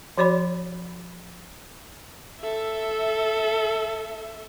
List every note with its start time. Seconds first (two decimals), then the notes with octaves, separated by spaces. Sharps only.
0.18 F3 F#4 C#5 D5 B5
2.41 A4 E5